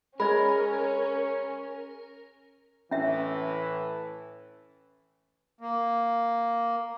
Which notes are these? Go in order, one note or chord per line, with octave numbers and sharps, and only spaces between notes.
G#3 C#4 A#4 D5 B5
A2 E3 C#4 E5
A#3